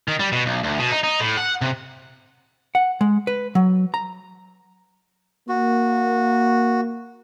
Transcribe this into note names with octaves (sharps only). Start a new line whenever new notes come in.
D#3
G3
B2
B1
D2
B2
D#4
D#4
A2
F#5
C3
F#5
G#3
B4
F#3
A#5
A#3 F#4